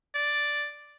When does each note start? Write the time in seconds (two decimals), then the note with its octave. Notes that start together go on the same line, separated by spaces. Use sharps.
0.15 D5